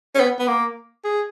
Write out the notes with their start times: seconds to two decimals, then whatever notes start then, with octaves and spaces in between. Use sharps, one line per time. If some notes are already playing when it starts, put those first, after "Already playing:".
0.15 C#4
0.20 B3
0.39 B3
0.48 A#3
1.04 G#4